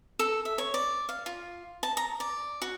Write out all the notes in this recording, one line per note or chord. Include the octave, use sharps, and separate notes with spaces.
A4
E5
C#5
D5
F5
F4
A5
A#5
D5
F#4